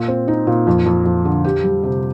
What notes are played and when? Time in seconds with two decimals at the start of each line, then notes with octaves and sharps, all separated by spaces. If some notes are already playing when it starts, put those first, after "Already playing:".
Already playing: A#2
0.08 C4
0.28 D#4
0.47 A#2
0.67 F2
0.86 F2
1.06 F2
1.25 D3
1.44 G4
1.64 G3
1.84 C3